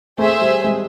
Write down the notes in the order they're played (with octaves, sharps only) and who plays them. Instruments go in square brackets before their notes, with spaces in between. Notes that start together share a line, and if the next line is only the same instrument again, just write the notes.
[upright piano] A3 [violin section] G#4 C5 E5
[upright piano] G3
G#3